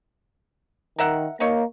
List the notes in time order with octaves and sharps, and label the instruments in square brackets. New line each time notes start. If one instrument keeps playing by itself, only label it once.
[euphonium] D#3 [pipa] A#4 E5 F#5
[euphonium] A#3 [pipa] D#4 C#5